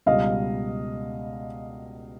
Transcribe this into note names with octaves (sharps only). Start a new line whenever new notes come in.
C#2 B2 G3 D#5 F5